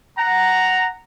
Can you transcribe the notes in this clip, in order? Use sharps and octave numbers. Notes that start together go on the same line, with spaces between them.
F#5 A#5